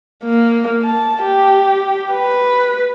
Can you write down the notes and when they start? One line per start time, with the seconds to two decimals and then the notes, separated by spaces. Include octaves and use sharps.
0.24 A#3
0.83 A5
1.23 G4
2.12 B4